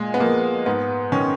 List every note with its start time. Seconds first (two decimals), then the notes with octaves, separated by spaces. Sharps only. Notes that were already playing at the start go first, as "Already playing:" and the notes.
Already playing: A#2 G#3
0.14 B3
0.20 F3 A#3
0.66 G#2 B3
1.12 D#3 C#4